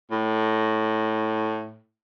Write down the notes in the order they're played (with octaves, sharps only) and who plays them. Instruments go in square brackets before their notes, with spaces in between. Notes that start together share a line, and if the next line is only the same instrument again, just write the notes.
[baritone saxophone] A2